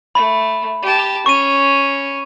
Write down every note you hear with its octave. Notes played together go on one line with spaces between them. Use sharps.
A3 B5
G4 A5
C#4 C#6 D#7